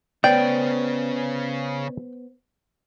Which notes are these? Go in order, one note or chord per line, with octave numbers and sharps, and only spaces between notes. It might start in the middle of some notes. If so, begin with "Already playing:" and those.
C#3 B3 C#4 B4 C5 D5 G5